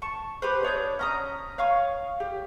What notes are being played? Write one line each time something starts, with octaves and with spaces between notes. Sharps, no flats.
A5 C#6
G4 B4 C5
D4 C#5 D#6 G6
C#4 A#5 D#6
C#5 F5 C#6 D#6
G4